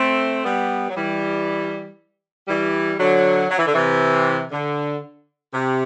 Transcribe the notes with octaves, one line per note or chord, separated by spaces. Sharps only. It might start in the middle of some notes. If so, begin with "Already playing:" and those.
Already playing: A3 C4
G3 B3
F#3
E3 G3
E3 G3
D3 F#3
F#3
E3
D3
C3 E3
D3
C3